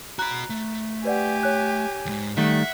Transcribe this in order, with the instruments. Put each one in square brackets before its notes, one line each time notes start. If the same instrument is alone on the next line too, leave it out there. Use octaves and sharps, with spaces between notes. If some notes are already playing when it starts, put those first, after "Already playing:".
[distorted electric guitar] F#4 B5 [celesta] A#5 F#6
[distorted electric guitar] A3
[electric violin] G4 G#5 [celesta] B4 D5 F#5
[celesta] C#5 F#6
[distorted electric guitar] F2 G#2
[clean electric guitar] D#3 G3 A3 [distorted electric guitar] E5 [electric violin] F#5